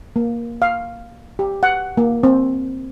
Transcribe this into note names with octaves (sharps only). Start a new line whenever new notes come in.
A#3
F5
G4
F#5
A#3
C4